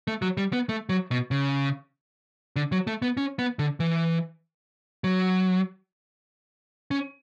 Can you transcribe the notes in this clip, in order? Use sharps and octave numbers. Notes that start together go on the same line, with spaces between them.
A3
F#3
G3
B3
A3
F#3
B2
C#3
D3
F#3
A3
B3
C#4
B3
D3
E3
F#3
C#4